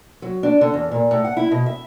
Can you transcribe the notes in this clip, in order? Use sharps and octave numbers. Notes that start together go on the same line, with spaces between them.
F#3
D4
D3
E2
A#2
A2
F#5
E4
B2
E5